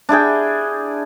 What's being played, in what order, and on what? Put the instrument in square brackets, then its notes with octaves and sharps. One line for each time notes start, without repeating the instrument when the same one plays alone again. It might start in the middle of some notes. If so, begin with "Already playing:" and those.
[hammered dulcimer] D4 E4 G#4 G5